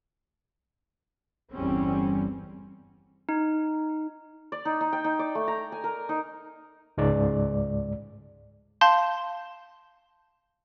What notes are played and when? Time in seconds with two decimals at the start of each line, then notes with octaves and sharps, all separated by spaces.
1.52 G1 E2 G3 C4 C#4
3.29 D#4
4.52 D5
4.65 D#4
4.81 D#4
4.93 G5
5.04 D#4
5.19 D5
5.35 A3
5.48 A#5
5.72 G#5
5.84 A#4
6.09 D#4
6.98 C#2 G#2 G#3 D5
8.81 F5 A5 C6 G6